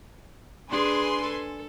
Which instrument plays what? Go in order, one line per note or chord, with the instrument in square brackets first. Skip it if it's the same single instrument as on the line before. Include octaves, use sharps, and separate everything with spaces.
[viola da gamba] D4 G#4 [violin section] B4 G#5 C6
[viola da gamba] A4